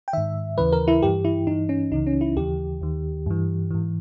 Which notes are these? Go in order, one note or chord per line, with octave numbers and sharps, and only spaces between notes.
G5
G#2 D#3 E5
D#2 C#3 E3 B4
A#4
E4
G2 E3 G4
E4
G2 E3 D#4
C#4
C#2 C#3 E3 D#4
C#4
E4
D#2 C#3 E3 G4
D#2 D#3
G2 E3
G#2 E3